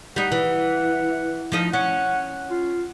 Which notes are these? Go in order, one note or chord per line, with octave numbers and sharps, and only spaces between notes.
G3 D#4 F#5
E3
F3 D#4 D#5
C#4 F#5
F4